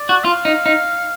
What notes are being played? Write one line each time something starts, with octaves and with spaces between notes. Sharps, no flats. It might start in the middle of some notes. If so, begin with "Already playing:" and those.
Already playing: D5
F#4
F4 F5
D#4
D#4